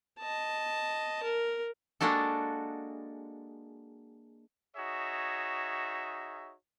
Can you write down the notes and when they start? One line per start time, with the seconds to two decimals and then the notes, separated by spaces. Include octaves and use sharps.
0.19 D#5 A5
1.23 A#4
2.01 G#3 A#3 D4 F#4 A4
4.76 D#4 F#4 G#4 C#5 E5